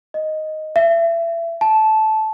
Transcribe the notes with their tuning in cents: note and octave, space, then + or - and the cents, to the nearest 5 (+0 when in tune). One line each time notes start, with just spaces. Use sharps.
D#5 +0
E5 +30
A5 -15